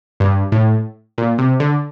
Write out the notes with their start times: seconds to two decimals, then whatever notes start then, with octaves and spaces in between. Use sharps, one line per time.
0.20 G2
0.52 A2
1.18 A#2
1.38 C3
1.60 D3